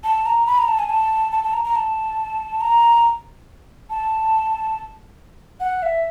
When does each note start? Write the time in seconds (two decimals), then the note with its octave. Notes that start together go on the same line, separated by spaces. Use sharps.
0.04 A5
0.26 A#5
0.47 B5
0.58 A#5
0.68 A5
0.79 G#5
0.89 A5
1.32 A5
1.44 A5
1.53 A#5
1.65 A#5
1.76 A5
2.61 A#5
3.90 A5
5.60 F#5
5.83 E5